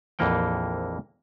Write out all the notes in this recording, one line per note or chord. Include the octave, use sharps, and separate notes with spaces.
A#1 F2 E3 A#3 F#5 G5